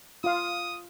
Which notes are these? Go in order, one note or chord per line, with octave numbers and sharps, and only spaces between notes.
F4 F5 D#6